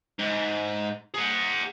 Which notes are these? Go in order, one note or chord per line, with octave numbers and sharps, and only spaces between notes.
G#2
G#4 F#5